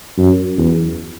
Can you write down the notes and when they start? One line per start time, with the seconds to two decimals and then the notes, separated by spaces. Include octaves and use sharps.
0.18 F#2
0.58 E2